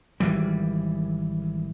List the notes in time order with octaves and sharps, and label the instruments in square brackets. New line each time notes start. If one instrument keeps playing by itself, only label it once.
[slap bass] G#1 E3 G3